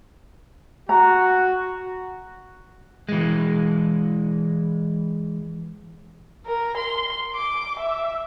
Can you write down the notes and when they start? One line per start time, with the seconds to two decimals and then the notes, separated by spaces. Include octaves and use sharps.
0.89 F#4 A#5
3.09 E3 G#3
6.46 A#4
6.77 C6
7.35 D6
7.80 E5